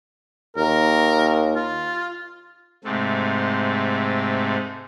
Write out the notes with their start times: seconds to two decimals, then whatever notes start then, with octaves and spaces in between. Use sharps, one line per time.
0.56 D#2 A#4
1.55 F4
2.85 G#2 C3 A3